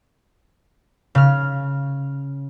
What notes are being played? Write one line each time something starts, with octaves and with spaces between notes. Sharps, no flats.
C#3 F6